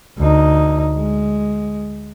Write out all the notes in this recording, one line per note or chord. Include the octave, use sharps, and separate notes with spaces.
D2 D#4
G#3